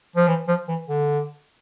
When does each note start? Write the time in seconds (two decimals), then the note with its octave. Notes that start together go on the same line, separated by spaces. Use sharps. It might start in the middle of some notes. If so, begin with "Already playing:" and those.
0.16 F3
0.28 E3
0.48 F3
0.68 E3
0.88 D3